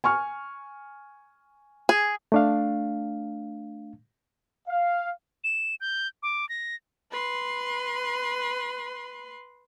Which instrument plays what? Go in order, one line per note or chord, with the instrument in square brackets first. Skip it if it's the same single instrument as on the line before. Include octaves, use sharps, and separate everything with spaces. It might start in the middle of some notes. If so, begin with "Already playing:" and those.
[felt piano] G#5 C#6 F6
[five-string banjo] G#4
[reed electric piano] A3 D4 F5
[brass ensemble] F5
[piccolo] E7
G6
D6
A#6
[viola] B4 C6